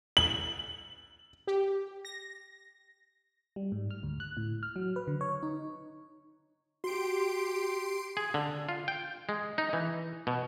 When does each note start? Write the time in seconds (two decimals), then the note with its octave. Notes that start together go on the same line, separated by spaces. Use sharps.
0.17 F#7
1.47 G4
2.05 A#6
3.56 G3
3.72 G#2
3.91 F6
4.03 D2
4.20 F#6
4.37 A2
4.63 F6
4.76 F#3
4.96 B4
5.07 D3
5.21 C#5
5.43 D#4
6.84 F#4 G4 C6 D7
8.17 G#4
8.34 D3
8.69 F4
8.88 G5
9.29 G#3
9.58 D#4
9.73 E3
10.27 B2